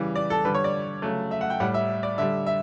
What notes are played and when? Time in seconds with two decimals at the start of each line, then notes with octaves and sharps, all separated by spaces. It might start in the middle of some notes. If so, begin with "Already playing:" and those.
Already playing: C#3 E3 G3
0.16 D5
0.30 A4
0.45 D3 G3 B4
0.54 C#5
0.64 D5
1.02 C#3 F#3 A3
1.31 E5
1.41 F#5
1.50 G5
1.60 A2 G3 F#5
1.74 E5
2.03 D5
2.18 D3 G3 E5
2.46 E5